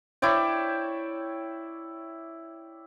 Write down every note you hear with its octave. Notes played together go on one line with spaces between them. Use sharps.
E4 C#5 D5 G5